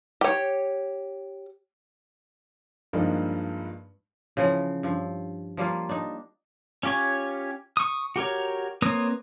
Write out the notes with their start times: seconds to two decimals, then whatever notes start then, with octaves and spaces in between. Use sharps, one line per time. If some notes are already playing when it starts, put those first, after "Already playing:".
0.21 G4 C#5
2.93 G2 F3 G#3 A#3 D4 D#4
4.37 C#3 E3 F3 F#5
4.83 G2 F3
5.57 F3 G3 A#3 F4
5.89 D4 D#4
6.83 C#4 F4 G4 C#5 G#5
7.77 C#6 D#6
8.16 F#4 G4 A#4 C#5
8.82 A#3 C4 B4 C#5 D#6